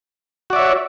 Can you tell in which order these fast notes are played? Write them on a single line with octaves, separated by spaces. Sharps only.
F#4 D5 E5 C#5